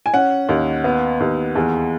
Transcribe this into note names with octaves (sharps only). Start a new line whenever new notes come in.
G#5
C#4 F#5
D#2
B3
D#2
E2